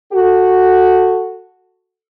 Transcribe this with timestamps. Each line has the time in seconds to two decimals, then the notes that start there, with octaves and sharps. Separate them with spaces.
0.13 F#4 A4